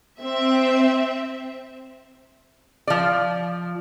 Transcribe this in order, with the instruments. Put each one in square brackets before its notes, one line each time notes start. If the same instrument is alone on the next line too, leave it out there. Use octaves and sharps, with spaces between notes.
[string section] C4 E5
[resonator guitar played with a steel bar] F3 D5